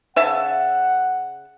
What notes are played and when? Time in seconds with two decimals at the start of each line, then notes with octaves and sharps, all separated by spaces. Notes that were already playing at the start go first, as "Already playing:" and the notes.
0.16 C#3 E5 F#5 A5